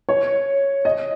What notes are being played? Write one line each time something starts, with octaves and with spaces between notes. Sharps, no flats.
C#5
D#5